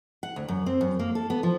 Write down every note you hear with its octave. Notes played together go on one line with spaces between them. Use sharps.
F#5
D2
F#2
C4
F#2
A#3
A4
B3
F3